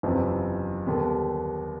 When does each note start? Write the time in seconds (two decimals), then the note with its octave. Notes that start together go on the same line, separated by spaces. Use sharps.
0.03 F#1 E2 C3 F3
0.86 D#2 D3 G3 B3